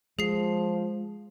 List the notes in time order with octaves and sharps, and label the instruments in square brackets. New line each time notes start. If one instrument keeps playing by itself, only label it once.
[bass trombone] F3 [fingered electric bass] G#3 [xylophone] G#4 C7